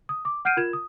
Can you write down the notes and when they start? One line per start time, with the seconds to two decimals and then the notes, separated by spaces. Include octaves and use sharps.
0.09 D#6
0.25 D6
0.45 F#5 F6 G6 C7 D7 D#7
0.57 F4 A#4 G#6 E7
0.73 D#6